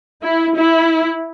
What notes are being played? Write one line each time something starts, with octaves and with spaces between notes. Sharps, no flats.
E4
E4